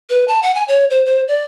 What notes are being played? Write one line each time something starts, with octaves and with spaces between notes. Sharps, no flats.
B4
A5
F#5
G#5
C#5
C5
C5
D5